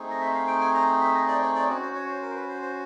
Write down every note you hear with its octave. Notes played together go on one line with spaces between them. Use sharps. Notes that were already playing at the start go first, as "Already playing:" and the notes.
Already playing: A3 C4 D#4 G#4
D#5
E5
F5
G5
G#5
A#5
E5
D#5
D5
C#5
D5
C#4 F#4 C#5
C5
C#5
C5
A#4
C5
B4
C5
C5